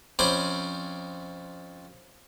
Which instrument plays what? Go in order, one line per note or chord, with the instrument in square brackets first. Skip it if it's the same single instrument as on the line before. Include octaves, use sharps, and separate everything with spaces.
[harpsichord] F2 C#4 C5 G#5 B5 D6